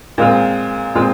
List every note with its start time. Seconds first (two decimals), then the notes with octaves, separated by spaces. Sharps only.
0.18 A#2 G#3 C4 F4
0.95 A#2 G#3 C4 F4